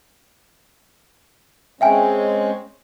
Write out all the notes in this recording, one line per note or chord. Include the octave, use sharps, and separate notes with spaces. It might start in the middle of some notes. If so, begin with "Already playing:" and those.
G#3 C4 C#4 E5 G5 G#5